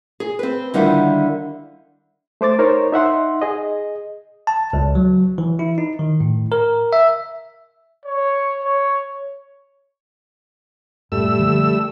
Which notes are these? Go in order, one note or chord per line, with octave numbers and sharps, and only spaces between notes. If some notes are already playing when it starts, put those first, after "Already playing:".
G#4
C4 B4
D3 D#3 G3 E4 F4 F#5
A3 C5 D6 A6
D#4 A#4 C5 C#5
D#4 E5 F#5 C6
G#4 D#5
A5
C#2
F#3
E3
E4
D#4
D#3
A2
A#4
E5
C#5
C#5
F#2 A#2 G3 A3 E6
D3 F3 A#3